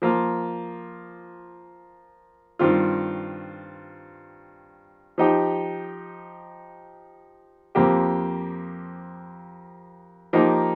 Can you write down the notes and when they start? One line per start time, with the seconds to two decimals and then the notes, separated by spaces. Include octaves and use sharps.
0.02 F3 A#3 F4
2.59 G2 D#3 C4 F4
5.18 F3 D#4 G4
7.75 F2 F3 A#3 G4
10.33 F3 A#3 D#4 G4